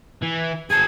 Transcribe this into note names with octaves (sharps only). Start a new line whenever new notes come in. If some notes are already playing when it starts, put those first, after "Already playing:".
E3
G#4 A5 G#6